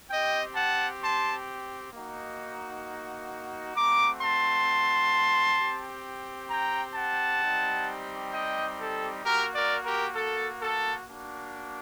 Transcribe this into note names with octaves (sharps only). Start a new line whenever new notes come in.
C4 G4 D#5 G5
F#5 A5
A5 C6
A#3 D#4 F#4
A3 C4 F#4 A#5 D6
A5 C6
C4 G4
G5 A#5
F#5 A5
G3 C4 D#4 G4
D#5 G5
A4
A#3 F#4 G4 A#4
A#4 D5
G4 A#4
A4
A4
A#3 D4 F#4